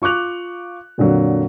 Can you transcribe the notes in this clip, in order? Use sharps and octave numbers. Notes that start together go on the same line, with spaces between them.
F4 C#6 D6 F#6 F7
F2 A#2 D3 F#3